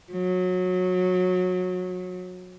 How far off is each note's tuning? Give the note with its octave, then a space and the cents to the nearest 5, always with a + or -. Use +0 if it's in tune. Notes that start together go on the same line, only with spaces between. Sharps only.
F#3 -20